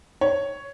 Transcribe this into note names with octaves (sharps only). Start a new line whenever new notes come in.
C#5